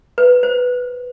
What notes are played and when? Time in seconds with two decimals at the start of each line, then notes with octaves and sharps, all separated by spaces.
0.18 B4
0.43 C5